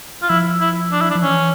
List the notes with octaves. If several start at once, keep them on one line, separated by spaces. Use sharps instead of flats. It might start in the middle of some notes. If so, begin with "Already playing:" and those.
F4
F3 E4
E4
D4
E4
D4
F3
E3 C#4